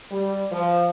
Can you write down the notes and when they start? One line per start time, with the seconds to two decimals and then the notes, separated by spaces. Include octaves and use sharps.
0.11 G3
0.52 F3